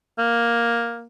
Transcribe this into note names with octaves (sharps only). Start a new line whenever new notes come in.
A#3